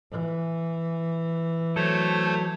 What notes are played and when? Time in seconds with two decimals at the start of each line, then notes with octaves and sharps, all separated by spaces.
0.11 E3
1.76 F#3 A3 A4 C5 C#5